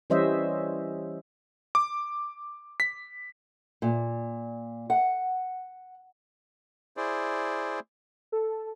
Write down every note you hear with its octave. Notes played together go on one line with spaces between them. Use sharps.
E3 G3 C#4 C5 D#5 E5
D6
B6
A#2
F#5
E4 G#4 C5 D5
A4